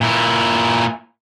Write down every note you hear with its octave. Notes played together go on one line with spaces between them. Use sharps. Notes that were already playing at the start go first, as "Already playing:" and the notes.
A#2 E4